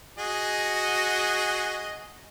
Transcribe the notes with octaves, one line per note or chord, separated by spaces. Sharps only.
F#4 G#4 D#5